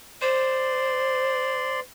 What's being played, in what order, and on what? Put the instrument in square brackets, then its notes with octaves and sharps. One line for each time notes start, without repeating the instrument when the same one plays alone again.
[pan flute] C5 [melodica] D5 C6